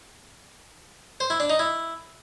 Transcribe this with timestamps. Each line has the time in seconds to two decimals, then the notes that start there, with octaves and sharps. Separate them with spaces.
1.20 C5
1.30 E4
1.40 D4
1.50 D#4
1.59 E4